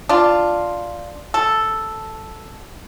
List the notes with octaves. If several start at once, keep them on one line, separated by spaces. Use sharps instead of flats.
D4 F4
A4